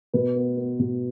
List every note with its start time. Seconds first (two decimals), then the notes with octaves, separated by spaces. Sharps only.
0.14 B2 B4
0.36 B3
0.57 B3
0.79 B2